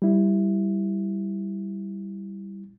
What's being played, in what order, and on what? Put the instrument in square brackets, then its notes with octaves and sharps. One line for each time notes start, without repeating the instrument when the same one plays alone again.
[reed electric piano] G3 E4